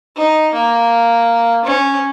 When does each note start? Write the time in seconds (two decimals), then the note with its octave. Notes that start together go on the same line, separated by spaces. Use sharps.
0.17 D#4
0.54 A#3
1.65 C#4